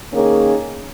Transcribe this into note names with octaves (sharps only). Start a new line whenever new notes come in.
D#3 A#3 C#4 G#4